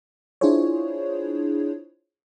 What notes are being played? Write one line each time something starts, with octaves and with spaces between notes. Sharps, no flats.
D4 E4 F4 G#4 C5 C#5